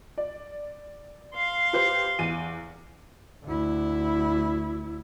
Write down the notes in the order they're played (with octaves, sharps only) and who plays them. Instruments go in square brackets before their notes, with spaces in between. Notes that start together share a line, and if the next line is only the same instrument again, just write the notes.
[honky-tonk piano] D5
[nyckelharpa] F5 C6
[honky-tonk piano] G4 B4 C5
E2 D#7
[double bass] D2 E4